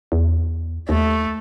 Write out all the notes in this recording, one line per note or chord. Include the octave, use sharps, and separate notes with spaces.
E2
D#2 A3